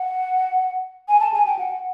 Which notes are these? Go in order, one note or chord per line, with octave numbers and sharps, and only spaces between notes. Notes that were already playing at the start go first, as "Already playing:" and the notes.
Already playing: F#5
G#5
A5
G#5
G5
F#5